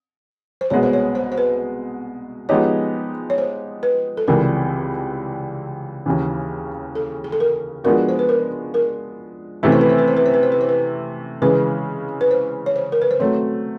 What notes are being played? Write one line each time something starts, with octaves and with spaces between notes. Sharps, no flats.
C5
C2 B2 G#3 B3 C#5
C5
C#5
C5
C5
B4
F3 G#3 B3 D#4 G4 C#5
C#5
C5
B4
A4
C#2 C3 E3 G3 A#4
D#2 C#3 E3
A4
G#4
A4
A#4
F3 G#3 B3 D4 F#4 A#4
C5
B4
A#4
A#4
C3 E3 A3 C#4 E4 B4
C5
B4
C5
B4
C5
B4
C5
B4
C5
B4
C5
B4
C#3 E3 G#3 B4
B4
C5
C#5
C5
A#4
B4
C5
F#3 A3 C4 C#5